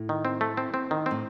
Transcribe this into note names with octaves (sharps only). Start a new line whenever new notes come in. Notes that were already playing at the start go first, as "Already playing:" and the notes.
Already playing: A2
D#3
C4
A3
C4
C4
D#3
A2 C4